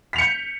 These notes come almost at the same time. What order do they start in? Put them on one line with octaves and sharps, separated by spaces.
B6 F7 C#7 G6